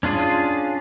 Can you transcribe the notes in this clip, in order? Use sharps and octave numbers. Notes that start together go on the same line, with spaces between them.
C#4 D4 F4 G#4